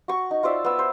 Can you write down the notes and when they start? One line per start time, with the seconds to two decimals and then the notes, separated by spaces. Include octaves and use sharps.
0.08 F#4 C#6
0.31 D#4
0.43 F4 C5 D5 E5
0.64 B3 E6
0.79 C5